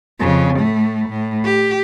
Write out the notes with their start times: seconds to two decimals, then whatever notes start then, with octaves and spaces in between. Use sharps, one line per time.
0.19 F2 C#3
0.59 A2 A3
1.09 A2
1.44 G4